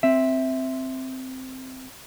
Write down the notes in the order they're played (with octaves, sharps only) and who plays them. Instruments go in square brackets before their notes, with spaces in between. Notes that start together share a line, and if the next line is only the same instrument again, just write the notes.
[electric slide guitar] C4 E5